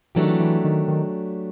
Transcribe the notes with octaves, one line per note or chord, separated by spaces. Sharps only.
E3 F#3 A3 D4 G4
D#3
E3
E3
D#3
D#3